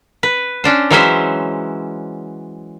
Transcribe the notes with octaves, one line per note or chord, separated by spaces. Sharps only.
B4
C#4 D4 C5
E3 F#3 G#3 C#4 C5 E5